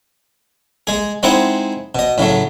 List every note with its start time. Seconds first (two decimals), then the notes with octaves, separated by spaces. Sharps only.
0.87 G#3 G#4
1.23 G#3 C4 D#4 E4 G#4 F#5
1.95 B2 D#5
2.18 A2 C#3 F#3 A3